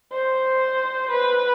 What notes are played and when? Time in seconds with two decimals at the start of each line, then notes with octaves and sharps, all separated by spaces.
0.13 C5
1.11 B4